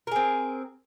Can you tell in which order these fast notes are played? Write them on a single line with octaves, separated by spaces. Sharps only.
A#4 G#4 C4